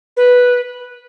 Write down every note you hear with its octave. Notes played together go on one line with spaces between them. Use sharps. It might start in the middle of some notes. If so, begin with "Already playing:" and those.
B4